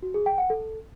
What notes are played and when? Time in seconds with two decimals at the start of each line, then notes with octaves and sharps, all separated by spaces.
0.02 F#4
0.14 G#4
0.26 G5
0.38 F#5
0.50 A4